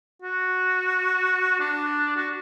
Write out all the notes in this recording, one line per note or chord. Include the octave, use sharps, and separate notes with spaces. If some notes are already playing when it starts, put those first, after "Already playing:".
F#4
D4
F#4